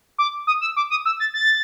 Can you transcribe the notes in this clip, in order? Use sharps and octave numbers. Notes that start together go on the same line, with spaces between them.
D6
D#6
E6
D6
D#6
E6
A6
A6